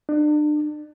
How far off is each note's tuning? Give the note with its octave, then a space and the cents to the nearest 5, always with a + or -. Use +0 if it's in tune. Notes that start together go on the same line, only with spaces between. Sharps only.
D4 +35